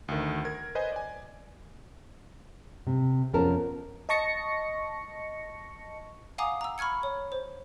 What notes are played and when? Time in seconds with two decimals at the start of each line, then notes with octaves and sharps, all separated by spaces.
0.08 D2 D#3
0.45 A#4 G#6
0.75 B4 C5 D#5 G#5
0.92 D5 G#5
2.87 C3
3.33 F2 F3 B3 C#4 A#4 A5
4.09 D#5 A5 C#6 A#6 C#7
6.38 F5 F#5 G#5 A#5 D6 D#6
6.61 A#5 E6
6.78 B5 C#6 F6 G#6 C#7
7.03 C#5
7.32 C5